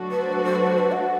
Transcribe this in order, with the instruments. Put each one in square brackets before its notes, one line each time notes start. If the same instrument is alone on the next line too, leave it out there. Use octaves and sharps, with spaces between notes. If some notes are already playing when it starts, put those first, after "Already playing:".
Already playing: [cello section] F#3 A3 D4 F#4 A4
[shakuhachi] B4
C5
B4
C5
B4
C5
B4
F#5